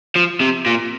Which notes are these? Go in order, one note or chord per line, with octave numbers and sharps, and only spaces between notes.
F3
C3
A#2